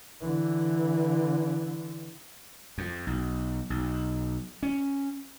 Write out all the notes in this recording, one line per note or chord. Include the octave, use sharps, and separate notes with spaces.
D3 E3
F2
B1
B1
C#4